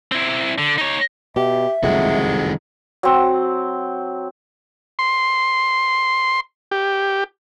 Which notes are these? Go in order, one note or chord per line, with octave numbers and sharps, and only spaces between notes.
C4 E4
D3
D#4 C#5
B2 G4 E5
F#1 C2 F2 D#3 G#3 F#4
F#3 C4
C6
G4